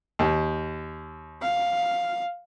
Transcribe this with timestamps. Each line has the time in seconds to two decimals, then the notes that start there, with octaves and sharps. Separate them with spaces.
0.19 D#2
1.42 F5